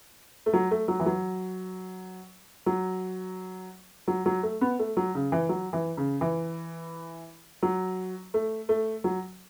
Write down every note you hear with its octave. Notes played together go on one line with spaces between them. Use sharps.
A3
F#3
A3
F#3
E3
F#3
F#3
F#3
F#3
A3
B3
A3
F#3
C#3
E3
F#3
E3
C#3
E3
F#3
A3
A3
F#3